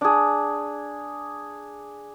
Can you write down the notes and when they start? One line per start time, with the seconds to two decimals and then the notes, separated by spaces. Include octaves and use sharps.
0.01 D4 G#4